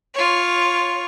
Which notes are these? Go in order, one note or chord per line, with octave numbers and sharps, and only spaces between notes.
F4 C#5